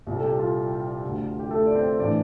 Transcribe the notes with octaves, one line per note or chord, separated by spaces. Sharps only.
C2 A#2
A4
G3 G4
F4
D2 D3
G4
A3 A4
D5
C4 C5
A2 E3 D4 D5